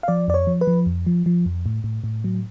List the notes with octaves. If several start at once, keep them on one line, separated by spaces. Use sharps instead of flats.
F5
F3 D5
F2 D5
C#5
F3
B4
F3
F2
F3
F3
F2
A2
A2
A2
F#3